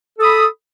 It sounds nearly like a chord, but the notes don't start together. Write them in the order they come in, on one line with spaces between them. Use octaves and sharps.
A4 D#6 B5